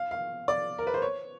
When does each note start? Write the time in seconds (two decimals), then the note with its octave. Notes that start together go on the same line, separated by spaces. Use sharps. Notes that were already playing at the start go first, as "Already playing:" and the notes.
Already playing: F5
0.11 F5
0.48 D5
0.79 A#4
0.87 B4
0.94 C5
1.02 C#5